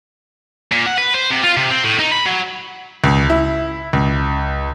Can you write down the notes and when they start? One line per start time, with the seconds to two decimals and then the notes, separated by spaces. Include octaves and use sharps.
0.72 A#2
0.86 F#5
0.98 B4
1.14 C5
1.31 C3
1.44 F4
1.57 C3
1.71 C4
1.84 A2
2.00 D#4
2.12 B5
2.26 F#3
3.04 C#2
3.30 E4
3.93 C#2